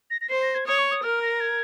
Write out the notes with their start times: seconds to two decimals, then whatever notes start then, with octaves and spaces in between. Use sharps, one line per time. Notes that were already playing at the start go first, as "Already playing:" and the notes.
0.11 A#6
0.21 A#6
0.30 C5 C7
0.42 A#6
0.55 G#6
0.67 C#5 D#6
0.78 C#6
0.91 D#6
1.03 A#4 F6
1.22 A#6
1.40 G#6